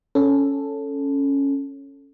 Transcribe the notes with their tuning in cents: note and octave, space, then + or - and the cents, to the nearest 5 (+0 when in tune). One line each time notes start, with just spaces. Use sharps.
C#4 +0 A4 +0